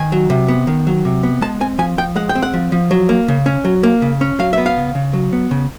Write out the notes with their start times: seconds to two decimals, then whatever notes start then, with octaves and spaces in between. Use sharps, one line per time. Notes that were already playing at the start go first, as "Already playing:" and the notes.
Already playing: D#3 G#5
0.12 F#3
0.30 C3
0.48 B3
0.67 D#3
0.87 F#3
1.05 C3
1.23 B3
1.41 G#3 A5
1.60 C4 G#5
1.78 F3 G#5
1.98 F3 G5
2.16 G#3 F#5
2.29 G5
2.35 C4
2.42 F#5
2.53 F3
2.72 F3
2.91 F#3
3.09 A#3
3.28 C#3
3.46 C#4
3.65 F#3
3.83 A#3
4.02 C#3
4.21 C#4
4.39 F#3 F5
4.53 B3 E5
4.66 F5
4.77 C#3
4.95 C#3
5.13 F#3
5.33 B3
5.51 C#3